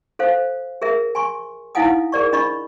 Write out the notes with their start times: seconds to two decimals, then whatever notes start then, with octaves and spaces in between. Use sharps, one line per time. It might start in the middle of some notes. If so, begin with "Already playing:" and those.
0.19 A4 C5 F5
0.82 G#4 A#4 E5
1.15 G#5 C6 C#6
1.75 D#4 E4 F5 F#5 G#5 D#6
2.12 G#4 A#4 D5 C#6
2.33 D4 D#5 B5 C#6